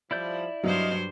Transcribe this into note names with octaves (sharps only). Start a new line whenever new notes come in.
F3 G3 E4 D5 G6
G2 F#3 C5 D#5 F5